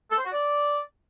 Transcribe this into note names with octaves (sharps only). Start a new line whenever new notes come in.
A4
C5
F#4
D5